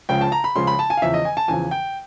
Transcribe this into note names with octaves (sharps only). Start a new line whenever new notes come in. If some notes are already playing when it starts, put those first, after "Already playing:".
C#2 C#3 F3 G5
A5
A#5
B5
C#2 C#3 F3 C6
B5
A5
G#5
F5
E2 C#3 F3 E5
D#5
G#5
A5
E2 C#3 F3 G#5
G5